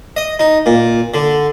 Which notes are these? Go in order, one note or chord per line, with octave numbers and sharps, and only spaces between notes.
D#5
D#4
A#2
D3